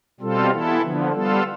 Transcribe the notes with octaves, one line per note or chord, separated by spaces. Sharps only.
B2 G3 C4 F4 A4
E3 B3 E4 A4
D3 F3 B3
G3 B3 F4 A4